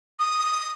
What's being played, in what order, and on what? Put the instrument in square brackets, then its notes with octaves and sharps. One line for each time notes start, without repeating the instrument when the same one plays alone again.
[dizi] D#6